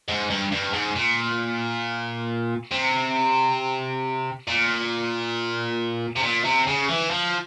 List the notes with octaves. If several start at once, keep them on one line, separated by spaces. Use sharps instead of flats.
G#2
G2
G2
G#2
A#2
C3
A#2
C3
A#2
C3
C#3
E3
F3